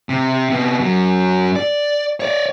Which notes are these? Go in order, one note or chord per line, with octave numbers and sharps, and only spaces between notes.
C3
C3 B3
F#2 F#3
D5
C#5 D5